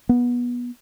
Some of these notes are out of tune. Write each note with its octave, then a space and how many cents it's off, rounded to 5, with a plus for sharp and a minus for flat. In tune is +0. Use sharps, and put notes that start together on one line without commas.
B3 -20